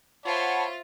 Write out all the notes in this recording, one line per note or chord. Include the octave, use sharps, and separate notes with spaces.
F4 C5 C#5 E5 F#5 A5 B5